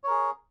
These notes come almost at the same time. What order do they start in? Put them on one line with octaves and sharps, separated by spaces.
C#5 A#4 G#4